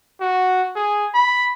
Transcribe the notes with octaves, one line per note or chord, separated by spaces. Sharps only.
F#4
G#4
B5